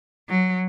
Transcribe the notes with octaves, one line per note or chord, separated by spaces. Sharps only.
F#3